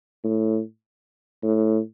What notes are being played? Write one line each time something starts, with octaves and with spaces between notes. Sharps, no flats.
A2
A2